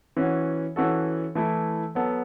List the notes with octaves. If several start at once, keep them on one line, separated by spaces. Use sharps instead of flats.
E3 C#4 F#4
E3 C#4 F#4 A4
E3 A3 E4
F#3 B3 A4